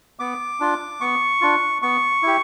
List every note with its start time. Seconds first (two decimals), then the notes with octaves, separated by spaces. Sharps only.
0.19 B3 D6
0.60 D4 F4
1.01 B3 C#6
1.41 D4 F4
1.82 B3 C#6
2.22 E4 G4